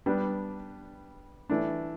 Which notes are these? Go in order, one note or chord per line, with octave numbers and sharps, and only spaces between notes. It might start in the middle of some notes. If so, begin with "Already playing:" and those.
G3 B3 D4
E3 A3 D4